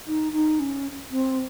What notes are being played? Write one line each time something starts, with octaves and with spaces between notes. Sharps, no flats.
D#4
D#4
C#4
C4